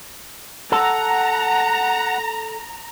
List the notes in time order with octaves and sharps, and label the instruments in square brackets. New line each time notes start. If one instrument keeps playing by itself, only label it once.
[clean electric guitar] A4 [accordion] F#5 [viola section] A#5